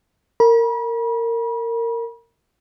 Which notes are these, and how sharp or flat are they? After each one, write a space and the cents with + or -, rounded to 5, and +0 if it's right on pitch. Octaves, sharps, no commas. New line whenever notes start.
A#4 -20 B5 -40